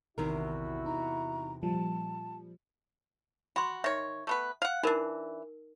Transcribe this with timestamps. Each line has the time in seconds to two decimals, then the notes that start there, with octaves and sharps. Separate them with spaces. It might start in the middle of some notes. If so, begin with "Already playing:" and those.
0.18 A#1 E2 C3 D#3 E4 F#4 A#4 E6
0.86 D#4 A#5
1.63 A#2 F3 G3 A5
3.56 F#4 B5 C6
3.84 D#3 C#5 E5
4.27 A3 B3 B4
4.62 F5 F#5
4.83 E3 D4 D#4 A#4